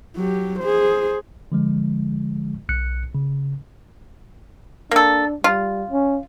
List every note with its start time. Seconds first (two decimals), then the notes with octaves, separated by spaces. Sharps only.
0.16 F#3 G4
0.60 G#4 C5
1.52 D3 F3 G#3
2.69 B1 F#6 C#7
3.15 C#3
4.91 A#3 D4 A4
5.44 G3 F4
5.90 C#4